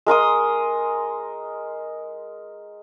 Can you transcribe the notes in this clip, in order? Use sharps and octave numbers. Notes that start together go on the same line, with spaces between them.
G#3 A#4 C6 D#6